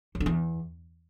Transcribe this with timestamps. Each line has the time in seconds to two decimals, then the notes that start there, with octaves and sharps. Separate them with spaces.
0.15 G2
0.20 D3
0.26 E2